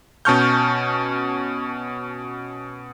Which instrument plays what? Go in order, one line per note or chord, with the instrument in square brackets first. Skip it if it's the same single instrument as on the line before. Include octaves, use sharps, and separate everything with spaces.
[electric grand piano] B2 C#4 A5 C#6 F6 G6